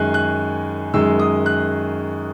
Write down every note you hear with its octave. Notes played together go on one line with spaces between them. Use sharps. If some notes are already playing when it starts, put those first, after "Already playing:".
Already playing: F#2 D#3 G#3 G#5 F#6
F#6
F#2 D#3 G#3 E6
D#6
F#6